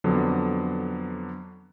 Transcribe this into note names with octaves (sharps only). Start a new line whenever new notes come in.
F2 D3 F#3 B3